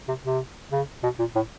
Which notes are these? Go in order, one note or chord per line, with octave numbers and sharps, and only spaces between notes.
C3
C3
C#3
B2
A#2
A2